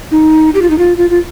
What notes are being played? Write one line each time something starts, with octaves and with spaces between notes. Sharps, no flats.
D#4
G4
F4
D#4
F4
F4
F4